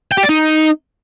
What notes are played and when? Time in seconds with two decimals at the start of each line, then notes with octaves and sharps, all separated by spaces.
0.12 G5
0.17 G4
0.23 D5
0.29 D#4